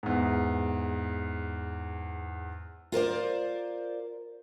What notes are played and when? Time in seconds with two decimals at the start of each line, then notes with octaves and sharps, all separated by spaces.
0.03 E2 G#2
2.92 F4 A#4 C5 D5